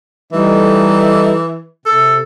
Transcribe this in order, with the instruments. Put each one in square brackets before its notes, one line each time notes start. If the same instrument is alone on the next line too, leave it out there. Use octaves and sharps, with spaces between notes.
[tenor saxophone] E3 [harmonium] G3 A3 D#4
[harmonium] C3 [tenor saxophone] A4